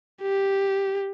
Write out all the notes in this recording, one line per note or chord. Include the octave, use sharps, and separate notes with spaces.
G4